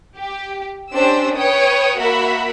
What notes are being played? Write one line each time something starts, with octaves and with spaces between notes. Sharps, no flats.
G4
C#4 D4 G4 C5 E6
B4 C#5 G5 D#6
A#3 F#4 A#4 E5 B5